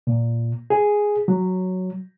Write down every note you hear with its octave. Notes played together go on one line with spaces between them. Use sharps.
A#2
G#4
F#3